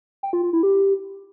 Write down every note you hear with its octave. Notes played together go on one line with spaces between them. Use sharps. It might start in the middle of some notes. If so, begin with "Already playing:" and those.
G5
F4
F4
E4
G4